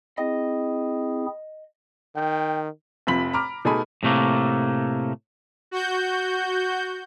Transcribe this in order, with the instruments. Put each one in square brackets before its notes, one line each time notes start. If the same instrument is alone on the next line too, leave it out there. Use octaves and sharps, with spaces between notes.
[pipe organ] C4 E4 G#4 [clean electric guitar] D#5
[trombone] D#3 [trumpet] G5
[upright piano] F1 C3 F3 B5 B6 F#7
A#5 B5 D6 F6
B2 A3 D#4 G#4 G#5 B5
[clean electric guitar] A2 C3 A3 A#3
[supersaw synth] F#4 G6